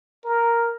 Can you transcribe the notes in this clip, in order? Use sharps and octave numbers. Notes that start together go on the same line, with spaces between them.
A#4